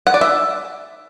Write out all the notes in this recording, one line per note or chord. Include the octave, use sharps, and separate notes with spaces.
F#5
D5
E5